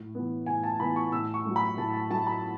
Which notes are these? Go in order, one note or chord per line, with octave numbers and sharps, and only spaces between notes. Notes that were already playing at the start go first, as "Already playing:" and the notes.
Already playing: A2
E3 B3
A2 G#5
A5
E3 B3 B5
C#6
A2 E6
C#6
F#3 A3
B5
A2 A5
A5
F#3 A3 A5
B5